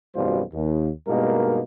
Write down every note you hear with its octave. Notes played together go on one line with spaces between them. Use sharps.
G#1 F#2 B2 G3 F4 C5
D#2
G2 B2 G#3 A#3 D#4 A#4